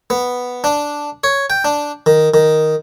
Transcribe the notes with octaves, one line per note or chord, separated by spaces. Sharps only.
B3
D4
C#5
G5
D4
D#3
D#3